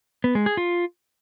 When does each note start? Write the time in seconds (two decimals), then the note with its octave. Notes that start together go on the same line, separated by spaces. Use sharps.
0.24 B3
0.35 G#3
0.46 G#4
0.57 F4